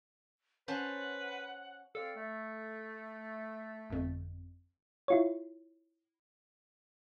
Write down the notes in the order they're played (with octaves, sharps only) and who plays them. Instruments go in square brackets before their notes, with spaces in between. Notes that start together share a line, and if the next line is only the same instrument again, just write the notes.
[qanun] C#4 C5 A5 [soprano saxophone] B4 [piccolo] F#5
[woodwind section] C4 D5 F5 [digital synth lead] A4
[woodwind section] A3
[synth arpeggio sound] G1 F2
E4 F4 C#5